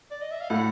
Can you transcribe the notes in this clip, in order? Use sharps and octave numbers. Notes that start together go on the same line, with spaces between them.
D5
D#5
E5
F5
A2 F#5